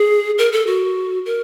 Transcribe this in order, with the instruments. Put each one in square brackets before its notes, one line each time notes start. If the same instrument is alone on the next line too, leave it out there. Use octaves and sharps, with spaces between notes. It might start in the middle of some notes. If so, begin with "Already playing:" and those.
Already playing: [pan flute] G#4
A#4
A4
F#4
A#4